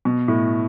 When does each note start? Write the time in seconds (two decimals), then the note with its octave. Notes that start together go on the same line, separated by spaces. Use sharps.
0.05 B2
0.28 A2